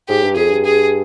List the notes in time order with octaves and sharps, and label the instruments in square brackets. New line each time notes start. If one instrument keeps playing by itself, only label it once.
[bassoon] G#2 [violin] G4
[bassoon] G2
[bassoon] F2 [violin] G#4
[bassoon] G2
[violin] G#4